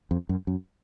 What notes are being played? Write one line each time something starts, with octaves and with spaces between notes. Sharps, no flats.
F2
F#2
F#2